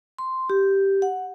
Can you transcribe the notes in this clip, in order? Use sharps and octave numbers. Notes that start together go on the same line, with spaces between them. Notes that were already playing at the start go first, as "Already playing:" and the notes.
C6
G4
F#5